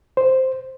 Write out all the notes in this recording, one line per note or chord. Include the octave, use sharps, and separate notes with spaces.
C5